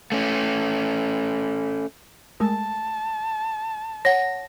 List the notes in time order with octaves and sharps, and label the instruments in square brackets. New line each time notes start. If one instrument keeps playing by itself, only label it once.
[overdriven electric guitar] A3 C#4
[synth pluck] G#3 A3 A#4 [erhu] A5
[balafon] C#5 [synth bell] F#5 A#6